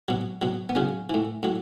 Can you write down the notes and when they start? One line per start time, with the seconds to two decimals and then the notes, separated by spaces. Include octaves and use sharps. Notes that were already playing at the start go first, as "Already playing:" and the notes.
0.08 B2 F#3
0.42 B2 F#3
0.69 B3
0.75 C#3 F#3 C#4
1.10 A2 E3
1.43 A2 F#3